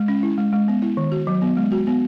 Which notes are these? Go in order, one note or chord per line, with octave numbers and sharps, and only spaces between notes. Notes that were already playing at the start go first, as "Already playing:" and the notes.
Already playing: G#3
C#4
E4
G#3
G#3
B3
E4
D#3
F#4
F#3
B3
G#3
F#4
B3